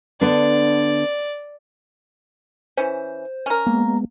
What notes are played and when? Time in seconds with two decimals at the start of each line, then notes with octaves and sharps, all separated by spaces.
0.21 D3 B3 D4 D5
2.77 E3 C#4 C5
3.46 C#4 A#4
3.67 G#3 A#3 B3